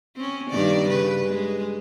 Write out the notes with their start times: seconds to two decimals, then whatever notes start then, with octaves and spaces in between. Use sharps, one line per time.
0.16 C4 C#4
0.50 G2 D#3 D5
0.89 C#3 B4
1.27 G#3